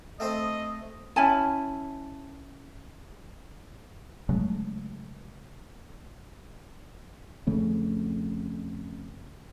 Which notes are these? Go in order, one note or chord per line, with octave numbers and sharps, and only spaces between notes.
A3 C4 C5 D#5
C#4 E4 G#5 A5
C#3 F#3 G#3 A3
F2 C#3 A3 C#4